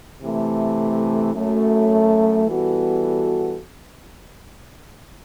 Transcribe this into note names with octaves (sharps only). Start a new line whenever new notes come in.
C3 E3 A3
F#2 F#3 A3
E3 G3 B3 F#4 A4